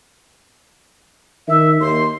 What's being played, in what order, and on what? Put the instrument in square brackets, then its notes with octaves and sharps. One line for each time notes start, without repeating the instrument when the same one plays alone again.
[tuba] D#3 [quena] E5
[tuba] D#2 [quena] C6